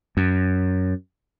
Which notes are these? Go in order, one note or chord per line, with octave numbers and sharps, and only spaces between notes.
F#2